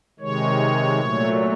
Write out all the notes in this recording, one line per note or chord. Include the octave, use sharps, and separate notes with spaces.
C3 D#3 G#3 C#5
A#2 F#3 A3